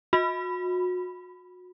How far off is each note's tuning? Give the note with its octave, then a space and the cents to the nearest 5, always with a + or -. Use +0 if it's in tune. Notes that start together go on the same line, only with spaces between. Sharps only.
F#4 -35 B5 +0